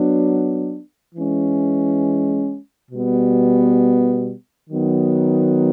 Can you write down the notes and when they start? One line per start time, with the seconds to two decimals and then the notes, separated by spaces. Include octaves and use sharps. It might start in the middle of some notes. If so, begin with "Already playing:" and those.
Already playing: F#3 B3 D4
1.15 E3 G#3 C#4
2.91 B2 G3 B3
4.68 D#3 F#3 B3